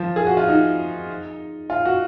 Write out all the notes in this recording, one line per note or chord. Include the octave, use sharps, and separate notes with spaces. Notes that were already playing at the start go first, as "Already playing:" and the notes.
Already playing: F3
G#4
F#4
F4
D#4
F4
F#4